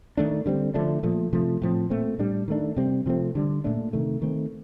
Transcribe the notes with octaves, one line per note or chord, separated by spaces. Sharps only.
D#3 A3 D4
D3 G3 C4
D3 F3 A3 D4
A#2 F3 A3
C3 F3 A3
A2 F3 C4
A#2 A3 C4
A2 G3 D4
D#3 A3 D4
C3 G3 C4
C3 F3 A3 C4
D3 G3 D4
A#2 A3 D4
C3 D#3 A3
D#3 A3 C4